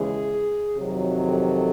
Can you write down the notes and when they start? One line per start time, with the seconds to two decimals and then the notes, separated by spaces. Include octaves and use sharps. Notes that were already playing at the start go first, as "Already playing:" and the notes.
Already playing: D#2 C#3 E3 G#3 G#4
0.78 F2 C3 D#3 F#3
1.25 A4